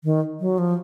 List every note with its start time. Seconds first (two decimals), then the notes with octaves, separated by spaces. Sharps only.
0.04 D#3
0.40 F#3
0.58 F3